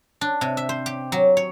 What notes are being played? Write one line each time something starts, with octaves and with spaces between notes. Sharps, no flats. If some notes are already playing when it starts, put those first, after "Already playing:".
D4
C3
E5
C5
G4
F#3
C#5